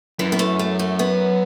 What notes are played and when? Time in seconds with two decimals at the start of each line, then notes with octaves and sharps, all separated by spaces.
0.19 F#2 E3
0.32 B3
0.39 A3
0.59 A3
0.79 A3
0.99 B3